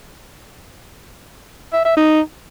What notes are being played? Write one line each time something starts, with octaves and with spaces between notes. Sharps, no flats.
E5
E5
D#4